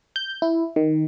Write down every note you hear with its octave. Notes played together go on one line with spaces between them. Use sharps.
G6
E4
D#3